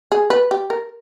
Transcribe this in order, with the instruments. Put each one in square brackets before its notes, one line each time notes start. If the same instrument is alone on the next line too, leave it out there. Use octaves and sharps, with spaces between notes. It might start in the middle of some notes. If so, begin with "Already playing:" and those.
[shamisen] G#4
B4
G4
A#4